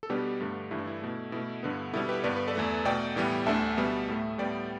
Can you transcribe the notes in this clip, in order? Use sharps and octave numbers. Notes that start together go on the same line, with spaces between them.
A4
B2 G3 B3 D4 G4
G2 D3 A3
G2 E3 A3 E4
D4
E4
B2 A3
B2 A3 E4
G2 D3 B3
B2 G3 B3 E4 A4
G4 B4
G2 D3 B3 D5
B4
A4 D5
E2 E3 A3
B2 A3 D5 G5
A2 E3 G3 B3
D2 D3 A3 E5 A5
B2 G3 B3
A2 A3
A2 G3 B3 D5 G5